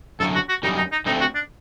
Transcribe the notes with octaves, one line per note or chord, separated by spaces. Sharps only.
F#2 D3 F#3 A4
F#4
F#4
F#2 D#3 G3 D#4
D#4
D#4
D3 A3 C4 D#4
F#4
D4